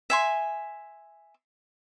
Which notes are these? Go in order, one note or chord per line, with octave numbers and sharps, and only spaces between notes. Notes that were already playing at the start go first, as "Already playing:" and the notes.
E5 G#5 C6